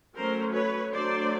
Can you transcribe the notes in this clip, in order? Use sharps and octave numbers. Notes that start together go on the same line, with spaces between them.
F#3 A3 C#4 A#4 C5
B4 C#5
F#3 A3 D4 C5 D5